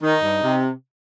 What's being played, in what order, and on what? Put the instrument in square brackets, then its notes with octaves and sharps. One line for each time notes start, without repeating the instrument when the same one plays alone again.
[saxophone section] D#3 [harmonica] D#4
[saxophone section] G2
C3